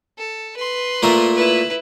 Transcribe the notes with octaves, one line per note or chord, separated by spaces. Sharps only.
A4
B4 C6
A#2 A3 A#4
E4 B4